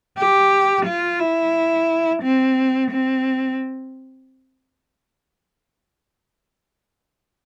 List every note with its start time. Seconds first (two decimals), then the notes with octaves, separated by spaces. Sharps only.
0.18 G4
0.86 F4
1.20 E4
2.22 C4
2.91 C4